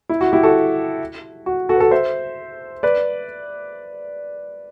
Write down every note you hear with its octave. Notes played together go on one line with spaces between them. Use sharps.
E4
F#4
E4 G4
F#4 A4
F#4
F#4 A4
B4
F#4 A4
C5 E5
B4 D5